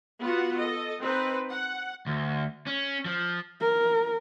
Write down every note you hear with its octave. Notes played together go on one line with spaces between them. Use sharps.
B3 F4 F#4 F#5
A4 D#5
C4 D#4 B4
F#5
D2
C#4
F3
A#4